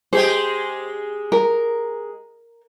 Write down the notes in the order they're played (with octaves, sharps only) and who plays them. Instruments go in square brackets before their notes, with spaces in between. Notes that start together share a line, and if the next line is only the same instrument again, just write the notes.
[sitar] G#3 G4 G#4 [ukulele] C5
[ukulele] A#4